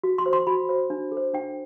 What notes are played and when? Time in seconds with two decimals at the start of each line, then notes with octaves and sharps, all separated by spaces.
0.03 F#4
0.18 C6
0.26 C5
0.33 C6
0.47 F#4 B5
0.69 C5
0.90 D4
1.12 A4
1.17 C5
1.34 D4 G5